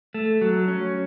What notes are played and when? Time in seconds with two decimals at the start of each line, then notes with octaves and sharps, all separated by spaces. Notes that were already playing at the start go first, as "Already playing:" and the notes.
0.14 A3
0.41 F#3
0.68 C#4